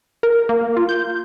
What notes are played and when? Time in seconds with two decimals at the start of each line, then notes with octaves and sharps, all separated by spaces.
0.23 A#4
0.49 A#3
0.77 F4
0.89 G6